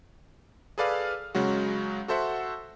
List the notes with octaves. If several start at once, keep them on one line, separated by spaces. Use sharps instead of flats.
G#4 A4 B4 D5 F5 F6
C#3 F#3 G#3 F#4
F#4 A4 C5 E5 F#5